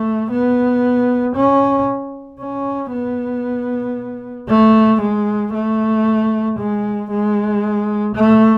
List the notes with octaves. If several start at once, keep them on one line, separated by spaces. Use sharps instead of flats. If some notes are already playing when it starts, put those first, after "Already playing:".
Already playing: A3
B3
C#4
C#4
B3
A3
G#3
A3
G#3
G#3
A3